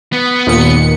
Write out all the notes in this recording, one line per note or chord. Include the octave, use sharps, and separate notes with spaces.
B3
D#2 A#2 C#7